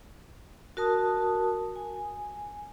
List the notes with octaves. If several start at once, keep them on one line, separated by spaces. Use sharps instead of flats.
F#4 A#4 A5 D#6
G#5